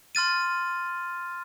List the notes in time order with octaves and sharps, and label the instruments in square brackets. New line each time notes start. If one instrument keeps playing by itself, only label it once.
[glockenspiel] C6 F6 A6 D#7